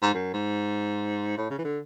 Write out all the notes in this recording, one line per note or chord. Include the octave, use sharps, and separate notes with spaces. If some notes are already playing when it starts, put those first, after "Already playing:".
G#2
F#2
G#2
A2
C#3
E3
D3